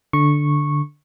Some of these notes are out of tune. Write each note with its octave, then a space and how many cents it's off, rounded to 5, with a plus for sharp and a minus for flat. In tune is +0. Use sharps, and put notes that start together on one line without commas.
D3 +0 C#6 -10